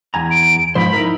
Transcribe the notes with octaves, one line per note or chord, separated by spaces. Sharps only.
E2 G#5 A#5
D7
G#2 F3 C5 B5
D#4 E4 A#4